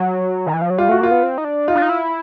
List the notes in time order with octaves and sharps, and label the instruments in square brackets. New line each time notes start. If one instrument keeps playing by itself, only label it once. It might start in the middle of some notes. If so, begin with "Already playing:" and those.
Already playing: [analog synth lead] F#3
D#3
E3
F3
F#3
[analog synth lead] G3 [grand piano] F4
[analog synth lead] A3 [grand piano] F#4
[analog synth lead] A#3 [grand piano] F4
[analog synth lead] B3
C4
D#4
D4
[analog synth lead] D#4 [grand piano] F4
[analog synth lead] D4
D#4
E4